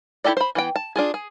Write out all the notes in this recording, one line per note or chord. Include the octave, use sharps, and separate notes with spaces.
E4 F#4 G4 A4 D5
C5 B5
E3 B3 G5
A5
D4 F4 G#4
G#4